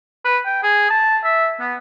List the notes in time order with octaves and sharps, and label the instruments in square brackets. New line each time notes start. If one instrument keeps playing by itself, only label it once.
[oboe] B4
G5
G#4
A5
E5
B3